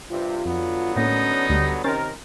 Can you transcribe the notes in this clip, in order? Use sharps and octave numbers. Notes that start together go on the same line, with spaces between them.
G2 C3 F4
F2 D3 F#3 B3
A2 A#3 C#4 D#4
D2 G3
C3 D#3 C#4 A#4 C5 A6